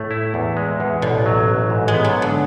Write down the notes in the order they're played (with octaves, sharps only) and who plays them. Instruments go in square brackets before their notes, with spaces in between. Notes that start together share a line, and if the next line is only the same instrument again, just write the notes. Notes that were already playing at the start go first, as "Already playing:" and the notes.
Already playing: [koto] A2 [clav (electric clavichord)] A3
[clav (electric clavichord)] E4
E2
G#3
E2
[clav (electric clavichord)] A1 [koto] B2
[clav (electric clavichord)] F#3
A1
G#2
[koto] G#3
[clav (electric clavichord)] B3
[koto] F#3
[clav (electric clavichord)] G#2
[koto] D3